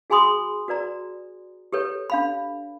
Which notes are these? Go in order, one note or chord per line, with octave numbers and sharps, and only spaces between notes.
F#4 G#4 G#5 B5 C6 D#6
F#4 B4 D5 A#5
G4 A4 B4 C#5
D4 F5 B5